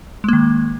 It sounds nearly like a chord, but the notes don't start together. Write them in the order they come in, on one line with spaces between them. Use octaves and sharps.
G#3 A#3 D#3